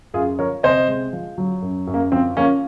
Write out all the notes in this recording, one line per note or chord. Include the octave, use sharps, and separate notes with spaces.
F#2 F4 G#4
F3 A#4 C#5
C3 C5 D#5
G#3
F3
F#3
F#2
F#2
A#3
F3 C4
F3 A#3 C#4